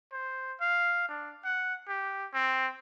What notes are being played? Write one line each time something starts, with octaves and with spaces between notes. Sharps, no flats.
C5
F5
D4
F#5
G4
C4